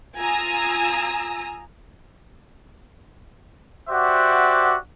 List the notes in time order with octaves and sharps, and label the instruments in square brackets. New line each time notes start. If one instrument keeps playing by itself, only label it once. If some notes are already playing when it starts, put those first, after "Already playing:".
[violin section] F4 G#5 A#5 D#6 E6
[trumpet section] F#4 G4 C5 D5 E5 F#5